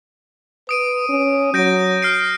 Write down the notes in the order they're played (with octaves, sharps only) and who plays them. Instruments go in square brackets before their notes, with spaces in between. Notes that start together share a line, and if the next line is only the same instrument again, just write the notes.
[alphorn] B4 [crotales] D#6 D7 D#7
[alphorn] C#4
[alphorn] F#3 [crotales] G6 A#6 D7
[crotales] F6 C7 D7